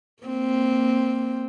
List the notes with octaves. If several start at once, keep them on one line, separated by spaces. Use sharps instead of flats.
A#3 C4